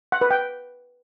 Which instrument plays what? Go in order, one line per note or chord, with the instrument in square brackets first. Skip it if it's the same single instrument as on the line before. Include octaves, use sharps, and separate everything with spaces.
[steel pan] F#5
B4
G5